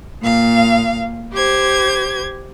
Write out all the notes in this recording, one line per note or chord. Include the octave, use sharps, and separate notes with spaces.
A#2 F5
G4 C5 G#6